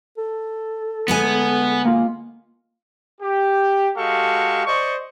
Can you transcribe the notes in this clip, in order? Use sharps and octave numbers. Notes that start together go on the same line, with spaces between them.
A4
D2 G#3 B3 G#5
A#3 F4
G4
G#3 F#4 G4 A4 F5 C#6
C5 D5 D#5 C#6